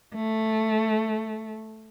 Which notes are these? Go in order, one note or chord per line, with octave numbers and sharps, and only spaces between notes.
A3